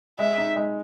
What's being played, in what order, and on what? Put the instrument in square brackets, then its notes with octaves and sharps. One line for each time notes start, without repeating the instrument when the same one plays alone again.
[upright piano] G#3 [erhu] E5
[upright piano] D#4
G#3